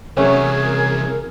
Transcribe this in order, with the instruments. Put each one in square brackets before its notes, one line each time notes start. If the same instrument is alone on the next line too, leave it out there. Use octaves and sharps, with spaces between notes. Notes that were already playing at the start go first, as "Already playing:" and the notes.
[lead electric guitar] C3 E3 [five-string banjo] F#3 A3 C#4 [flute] G#4 [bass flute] A#4